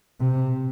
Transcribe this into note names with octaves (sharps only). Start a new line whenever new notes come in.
C3